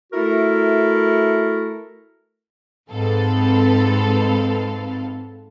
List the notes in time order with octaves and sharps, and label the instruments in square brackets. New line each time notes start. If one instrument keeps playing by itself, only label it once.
[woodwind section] A3 E4 F#4 A4 A#4
[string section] G#2 C4 A4 B4 F5